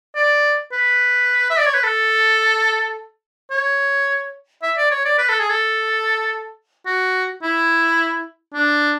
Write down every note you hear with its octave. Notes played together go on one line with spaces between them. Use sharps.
D5
B4
E5
D5
C#5
B4
A4
C#5
E5
D5
C#5
D5
B4
A4
G#4
A4
F#4
E4
D4